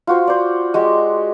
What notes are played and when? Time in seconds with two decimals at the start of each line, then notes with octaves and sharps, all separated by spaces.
0.07 F4 F#4 C5
0.27 C5 D5
0.74 G#3 F#4 G4